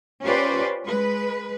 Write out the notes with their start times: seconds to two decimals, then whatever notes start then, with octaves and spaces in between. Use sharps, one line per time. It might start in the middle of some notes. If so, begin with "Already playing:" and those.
0.22 C#4 F4 G4 B4 C5 D5
0.85 G#3 B4